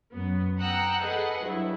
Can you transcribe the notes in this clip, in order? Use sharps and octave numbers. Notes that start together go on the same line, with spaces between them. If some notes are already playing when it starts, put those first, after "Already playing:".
F#2 B3
F#5 G5 A#5 D#6 E6 F#6
G#4 A4 B4 D#5 F#5
G2 F#3 E4